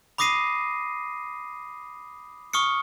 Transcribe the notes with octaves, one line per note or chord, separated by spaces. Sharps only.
B5 D6 D#6 A#6 C7 D#7
C#6 D#6 F6 C#7